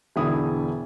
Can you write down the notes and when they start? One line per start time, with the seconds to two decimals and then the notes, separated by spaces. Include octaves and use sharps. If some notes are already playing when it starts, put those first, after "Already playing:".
0.16 E1 D3 E4 D#6